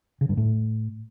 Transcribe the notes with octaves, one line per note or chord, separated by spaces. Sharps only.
C#3
G2
A2